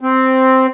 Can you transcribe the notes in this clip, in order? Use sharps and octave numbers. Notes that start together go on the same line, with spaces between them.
C4